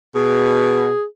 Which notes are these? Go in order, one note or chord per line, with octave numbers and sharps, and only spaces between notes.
B2 G#4